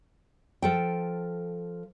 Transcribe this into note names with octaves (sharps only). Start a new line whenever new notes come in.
F3 A4 G5